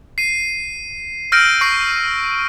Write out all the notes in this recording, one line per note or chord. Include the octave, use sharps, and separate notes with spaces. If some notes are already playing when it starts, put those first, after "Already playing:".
C7 D#7
E6 F6 G6 A#6 D7 D#7
C#6 F6 A#6 C7